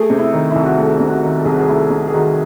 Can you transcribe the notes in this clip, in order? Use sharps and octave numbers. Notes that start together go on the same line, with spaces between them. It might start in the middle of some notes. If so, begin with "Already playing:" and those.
Already playing: A3 G#4
C3
E4
D#3
C2 E4
F#4
A3 G#4
C3
F#4
D#3
A4
C2 G#4
F#4
G#4
A3 E4
C3
G#4
D#3 F#4